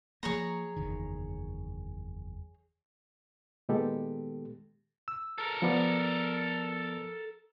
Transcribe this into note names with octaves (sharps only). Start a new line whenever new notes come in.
F3 A#3 G#4 C#5 A#5
F#1 E2 D#3
A#2 D#3 G#3 B3 G4 A4
E6
A4 A#4
F3 B3 D5